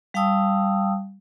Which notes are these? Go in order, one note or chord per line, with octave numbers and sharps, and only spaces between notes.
G3 F5 G5 A5 D#6 E6